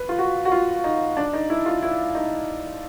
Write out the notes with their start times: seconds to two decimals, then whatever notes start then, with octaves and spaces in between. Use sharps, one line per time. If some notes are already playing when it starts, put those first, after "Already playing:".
Already playing: B4
0.09 F4
0.19 F#4
0.45 F#4
0.52 F4
0.84 D#4
1.17 D4
1.33 D#4
1.50 E4
1.66 F4
1.83 E4
2.15 D#4